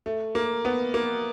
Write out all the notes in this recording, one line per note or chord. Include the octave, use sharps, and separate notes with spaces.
A3
A#3
B3
A#3